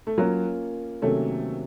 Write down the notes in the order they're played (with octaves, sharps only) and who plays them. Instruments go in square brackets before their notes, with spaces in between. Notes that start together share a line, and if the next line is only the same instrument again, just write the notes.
[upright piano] A3
[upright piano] F#3 [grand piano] A#3 C#4 F4 A#4
[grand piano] C3 D#3 F#3 A#3 C#4 [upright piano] A3